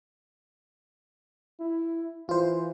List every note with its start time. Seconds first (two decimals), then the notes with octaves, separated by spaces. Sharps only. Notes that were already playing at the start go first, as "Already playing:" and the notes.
1.60 E4
2.29 E3 F4 C5